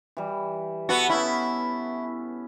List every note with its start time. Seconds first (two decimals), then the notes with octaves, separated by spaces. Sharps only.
0.17 E3 G3
0.89 B3 F#4 A4
1.09 B3 C#4 E4